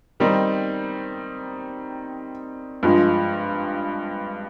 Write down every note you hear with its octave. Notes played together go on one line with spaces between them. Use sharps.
D#3 G3 C4 D#4
G2 F3 G#3